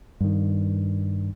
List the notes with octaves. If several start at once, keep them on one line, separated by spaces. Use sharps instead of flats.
G2 D#3